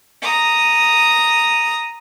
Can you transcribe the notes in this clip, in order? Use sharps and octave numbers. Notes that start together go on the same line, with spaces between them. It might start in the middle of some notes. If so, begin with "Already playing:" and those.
A#5 D#6